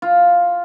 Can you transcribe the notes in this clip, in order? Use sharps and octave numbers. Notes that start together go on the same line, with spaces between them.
F4